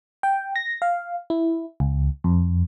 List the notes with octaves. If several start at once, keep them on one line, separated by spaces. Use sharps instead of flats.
G5
A#6
F5
E4
C#2
F2